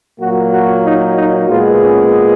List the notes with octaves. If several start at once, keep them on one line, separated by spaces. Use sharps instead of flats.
A#2 F#3 A#3 F#4
F#4
D#4
D#4
A#2 G#3 B3 F4
C#4